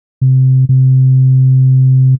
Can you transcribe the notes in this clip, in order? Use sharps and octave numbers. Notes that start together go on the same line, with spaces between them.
C3
C3